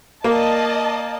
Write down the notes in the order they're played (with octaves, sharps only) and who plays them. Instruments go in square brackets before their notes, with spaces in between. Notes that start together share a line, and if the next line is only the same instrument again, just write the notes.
[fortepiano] A#3 [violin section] D5 D#5 A5